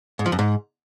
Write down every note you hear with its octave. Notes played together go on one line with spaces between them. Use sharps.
G#2
F3
F#2
G#2